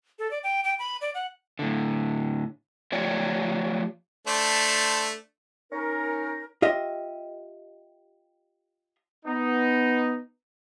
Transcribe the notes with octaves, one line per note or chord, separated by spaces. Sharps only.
A4
D5
G5
G5
B5
D5
F#5
A2 D3
F3 A3 F4 G4 C#5 D5
A3 D4 C5
C#4 D#4 A#4
F4 G4 D#5 E5
B3 D#4